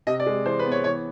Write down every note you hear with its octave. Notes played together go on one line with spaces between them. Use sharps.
C3 D#5
D5
G#3
E3 C5
B4
B3
C#5
E3 C#5